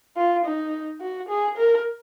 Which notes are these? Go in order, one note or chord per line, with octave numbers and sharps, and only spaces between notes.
F4
D#4
F#4
G#4
A#4